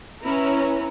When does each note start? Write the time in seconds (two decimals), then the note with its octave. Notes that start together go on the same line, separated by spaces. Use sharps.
0.23 C#4 E4 B4 A#5